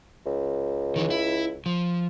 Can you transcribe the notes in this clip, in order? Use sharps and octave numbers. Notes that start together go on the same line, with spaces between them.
C#2
D#3 E3
E4
F3